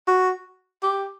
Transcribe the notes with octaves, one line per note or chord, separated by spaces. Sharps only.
F#4
G4